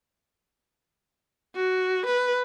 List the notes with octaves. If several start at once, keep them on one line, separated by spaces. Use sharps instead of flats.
F#4
B4